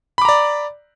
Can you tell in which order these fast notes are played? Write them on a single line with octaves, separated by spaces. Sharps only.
B5 D6 A#5 D5